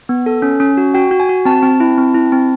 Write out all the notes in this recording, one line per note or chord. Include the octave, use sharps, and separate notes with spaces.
B3
A4
C#4
C#4
F#4
F#4 G5
F#4
G#5
F#4
C4 A5
C4
E4
C4
E4
C4